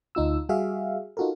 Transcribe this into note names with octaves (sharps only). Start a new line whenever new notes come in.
D2 D#4 F4 E6
G3 F#4 G#4 E5 F5
D#4 F4 F#4 A4 A#4